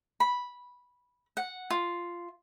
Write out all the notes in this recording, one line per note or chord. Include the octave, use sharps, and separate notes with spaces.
B5
F#5
F4